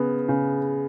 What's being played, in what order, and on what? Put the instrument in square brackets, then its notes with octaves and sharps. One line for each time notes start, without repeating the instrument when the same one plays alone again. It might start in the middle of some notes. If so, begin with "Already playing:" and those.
Already playing: [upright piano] C#3 B3
C#3